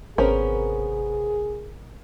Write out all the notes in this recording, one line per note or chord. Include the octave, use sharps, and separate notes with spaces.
G#1 C3 B3 C#4 G#4 A#4 C5